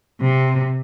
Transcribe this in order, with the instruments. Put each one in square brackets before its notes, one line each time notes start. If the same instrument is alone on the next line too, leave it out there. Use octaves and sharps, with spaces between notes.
[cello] C3